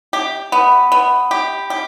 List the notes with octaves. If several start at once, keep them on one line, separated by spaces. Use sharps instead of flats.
G4
B3
B3
G4
G4